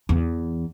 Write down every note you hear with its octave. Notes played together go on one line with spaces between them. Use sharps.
E2